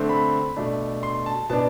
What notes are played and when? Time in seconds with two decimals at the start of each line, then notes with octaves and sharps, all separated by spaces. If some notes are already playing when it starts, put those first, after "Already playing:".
Already playing: D3 A3 C4
0.09 B5
0.57 B2 A3 D4
1.03 C6
1.26 A5
1.50 B2 B3 D4 A5